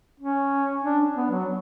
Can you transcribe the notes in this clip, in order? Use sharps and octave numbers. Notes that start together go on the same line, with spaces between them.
C#4
D4
B3
F#3